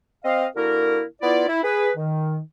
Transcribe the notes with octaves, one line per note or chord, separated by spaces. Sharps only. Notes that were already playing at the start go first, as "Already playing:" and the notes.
C4 D#5 F5
D3 A#3 E4 F#4 A#4
B3 E4 F4 D5
E4
G#4 B4
D#3